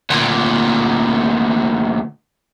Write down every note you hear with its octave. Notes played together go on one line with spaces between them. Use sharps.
D2 A#2